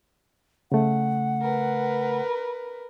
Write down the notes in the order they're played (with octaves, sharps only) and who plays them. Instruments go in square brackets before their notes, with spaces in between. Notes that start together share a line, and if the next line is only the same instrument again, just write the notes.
[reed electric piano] C#3 A3 [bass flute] F#5
[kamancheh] A#4 B4